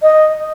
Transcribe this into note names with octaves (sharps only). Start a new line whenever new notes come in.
D#5